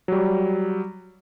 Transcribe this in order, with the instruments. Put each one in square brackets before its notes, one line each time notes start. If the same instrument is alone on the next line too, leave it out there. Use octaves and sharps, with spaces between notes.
[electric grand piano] F#3 G3